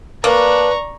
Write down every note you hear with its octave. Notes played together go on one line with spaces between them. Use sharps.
A#3 D4 B4 A#5 C#6